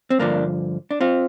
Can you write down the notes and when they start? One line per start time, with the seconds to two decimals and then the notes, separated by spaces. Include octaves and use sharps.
0.10 C4
0.19 G2 D3 F3 A#3 D4
0.91 D4
1.01 C4 F4